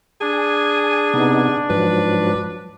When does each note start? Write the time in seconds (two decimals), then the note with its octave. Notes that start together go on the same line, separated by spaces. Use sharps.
0.21 D4 G#4 G#5
1.14 C3 B3 D#4
1.70 G#2 F3 F#3 B4